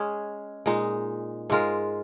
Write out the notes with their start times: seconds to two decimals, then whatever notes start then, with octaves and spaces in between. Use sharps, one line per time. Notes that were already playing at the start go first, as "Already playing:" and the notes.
Already playing: G#3 C#4 G#4
0.66 A#2 G#3 D#4
1.50 G#2 G#3 F4 A#4